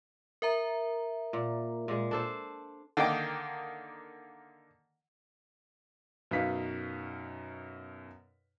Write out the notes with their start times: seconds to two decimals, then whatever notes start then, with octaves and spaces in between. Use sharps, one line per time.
0.42 A#4 E5 A#5
1.33 A#2
1.88 A#2 G#3
2.11 D4 A4 C5
2.97 D3 D#3 A#3 D#5 G5 D6
6.31 F#2 B2 D#4 B4 F5 B6